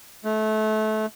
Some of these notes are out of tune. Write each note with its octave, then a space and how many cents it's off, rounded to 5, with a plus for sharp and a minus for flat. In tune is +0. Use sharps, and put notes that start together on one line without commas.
A3 -25